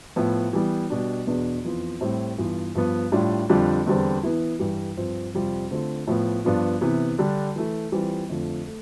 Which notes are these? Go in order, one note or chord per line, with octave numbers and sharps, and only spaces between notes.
A2 F3 B3
E3 G3 B3
B2 G3 D4
E2 B2 B3 D4
F2 E3 B3 F4
A2 G3 C4 E4
G2 E3 B3 F4
G2 F3 B3
A2 G3 D4 F4
F2 D3 G3 D4 F4
E2 D3 G3 C4
E3 B3 E4
G2 E3 G3
G2 F3 C4 F4
F2 C3 G3 C4 F4
D3 A3 C4 F4
A2 F3 B3
G2 F3 B3 D4 F4
C3 E3 B3 E4
D3 G3 D4
E3 A3 E4
E3 G3 C4 F4
F2 D3 F3 A3
A3